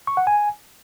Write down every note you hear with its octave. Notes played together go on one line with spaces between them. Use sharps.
C#6
F#5
G#5